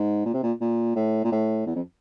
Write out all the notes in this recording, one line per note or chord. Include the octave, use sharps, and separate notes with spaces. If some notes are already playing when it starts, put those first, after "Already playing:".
Already playing: G#2
A#2
C3
A#2
A#2
A2
A#2
A2
E2
F2